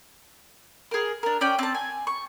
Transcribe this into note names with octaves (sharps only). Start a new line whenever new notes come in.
G#4 A#4
D4 A#4
C#4 D5 G5
C4 A5
G#5
C#6